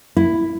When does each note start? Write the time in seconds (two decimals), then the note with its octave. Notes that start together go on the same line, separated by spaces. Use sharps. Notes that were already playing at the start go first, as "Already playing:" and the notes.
0.17 E4